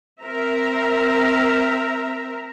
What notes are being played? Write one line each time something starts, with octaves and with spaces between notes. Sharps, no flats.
C4 A#4 E5 A#5